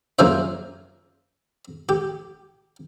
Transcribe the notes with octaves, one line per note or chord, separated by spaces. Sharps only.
F#2 C#3 A#3 F4 C5 E5
G4